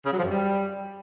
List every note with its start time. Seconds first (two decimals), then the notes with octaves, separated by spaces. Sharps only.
0.05 C#3
0.11 F#3
0.17 F3
0.23 F#2
0.29 G3